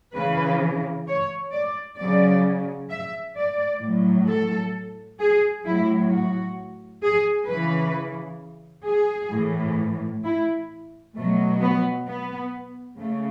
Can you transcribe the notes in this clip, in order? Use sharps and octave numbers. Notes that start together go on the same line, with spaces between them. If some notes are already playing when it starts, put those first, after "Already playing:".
C#3 E3 B4
C#5
D5
C#3 F#3 D5
E5
D5
A2 F#3
A4
G#4
A2 F#3 E4
F#4
G#4
C#3 E3 B4
G#4
A2 E3
E4
B2 F#3 A3
B3
B3
C#3 A3